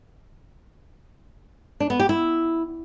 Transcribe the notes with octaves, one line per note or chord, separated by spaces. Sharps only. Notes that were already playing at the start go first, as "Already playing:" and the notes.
D4
B3
G4
E4